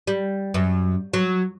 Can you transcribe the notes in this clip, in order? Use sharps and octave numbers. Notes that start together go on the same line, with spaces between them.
G3
F#2
F#3